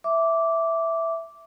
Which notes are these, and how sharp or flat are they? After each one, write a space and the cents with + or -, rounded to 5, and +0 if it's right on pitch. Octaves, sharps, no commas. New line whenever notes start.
E5 +0 D6 -10